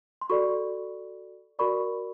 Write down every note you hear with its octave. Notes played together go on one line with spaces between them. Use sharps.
C6
F#4 A4 D5 B5 C#6
F#4 A#4 D5 B5 C#6